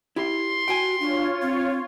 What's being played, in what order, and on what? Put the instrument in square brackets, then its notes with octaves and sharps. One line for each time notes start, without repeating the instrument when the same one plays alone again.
[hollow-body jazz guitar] E4 G4 [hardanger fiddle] C6
[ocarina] F#4 [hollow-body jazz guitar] G5 G#5
[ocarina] D4 [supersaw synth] F4 C#5
[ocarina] C4